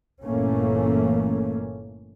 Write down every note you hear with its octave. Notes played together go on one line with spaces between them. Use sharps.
G1 A#2 E3 A3 A#3 C#4